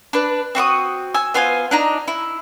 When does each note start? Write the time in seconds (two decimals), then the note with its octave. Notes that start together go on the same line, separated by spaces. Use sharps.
0.13 D4 B4
0.55 C4 F#4 C#6 D#6
1.14 G#5 E6
1.34 B3 F4 C5 G#5
1.71 D4 D#4 A#5
2.08 E4